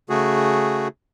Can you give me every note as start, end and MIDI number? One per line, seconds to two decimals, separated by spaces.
0.10 0.88 49
0.10 0.88 57
0.10 0.88 66
0.10 0.88 68